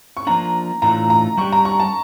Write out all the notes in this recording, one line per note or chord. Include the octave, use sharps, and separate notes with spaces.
C#6
F3 A#3 D4 A#5
A2 E3 A3 D4 F4 A#5
A#5
G3 D4 G4 C#6
A#5
C#6
A5